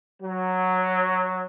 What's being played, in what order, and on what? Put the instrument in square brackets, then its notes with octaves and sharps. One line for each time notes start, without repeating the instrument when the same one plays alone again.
[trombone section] F#3